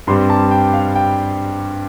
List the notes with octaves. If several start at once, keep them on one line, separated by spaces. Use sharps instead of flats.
G2 G3 C4 C6
A5
G5
F5
G5